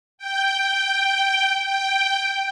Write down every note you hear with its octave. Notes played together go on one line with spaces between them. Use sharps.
G5
G5